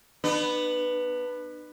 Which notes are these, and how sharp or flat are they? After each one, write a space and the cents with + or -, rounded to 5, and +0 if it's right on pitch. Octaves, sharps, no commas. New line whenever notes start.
B3 +0 D4 +45